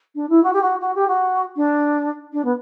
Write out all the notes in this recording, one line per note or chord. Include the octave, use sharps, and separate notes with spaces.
D4
E4
F#4
G4
F#4
F#4
G4
F#4
D4
D4
B3